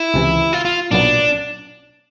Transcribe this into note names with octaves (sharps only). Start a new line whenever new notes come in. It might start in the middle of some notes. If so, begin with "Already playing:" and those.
Already playing: E4
C#2 C3 E3
F4
F4
B1 A#2 F#3 B3 D4